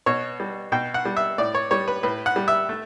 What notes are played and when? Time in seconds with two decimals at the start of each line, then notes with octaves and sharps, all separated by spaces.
0.06 B2 C#5
0.40 G3
0.72 B2 G5
0.94 F#5
1.05 G3
1.17 E5
1.38 A2 D5
1.55 C#5
1.71 G3 C#5
1.88 B4
2.03 A2 B4
2.26 F#5
2.36 G3
2.48 E5
2.69 A3